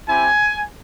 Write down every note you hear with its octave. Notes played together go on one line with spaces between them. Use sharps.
C4 E4 G4 G#5